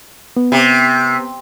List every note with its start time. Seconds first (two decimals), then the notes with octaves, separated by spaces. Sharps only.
0.37 B3
0.52 C3